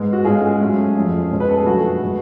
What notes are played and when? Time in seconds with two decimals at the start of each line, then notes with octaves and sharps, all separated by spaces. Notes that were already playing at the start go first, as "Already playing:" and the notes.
Already playing: G#2 G#3 B3
0.13 F#4
0.24 G#2 G#3 C#4 F4 G#4
0.61 G#2 F#3 A3 C#4
0.96 F2 F3 A3 C#4
1.31 B2 G#3 C#4
1.40 B4
1.49 A4
1.58 G#4
1.66 F#2 D3 F3 A3 F#4
2.01 B2 G#3 B3